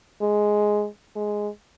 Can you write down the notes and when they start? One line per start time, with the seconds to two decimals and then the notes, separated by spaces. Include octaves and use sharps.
0.22 G#3
1.16 G#3